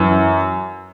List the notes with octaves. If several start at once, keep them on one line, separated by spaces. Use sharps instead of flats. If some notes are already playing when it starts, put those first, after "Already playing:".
Already playing: F#2 E3